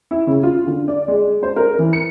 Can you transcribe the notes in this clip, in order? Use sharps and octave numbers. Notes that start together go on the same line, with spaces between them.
E4
C#3
F4
D3
D5
G#3
C5
A#4
E3
C#7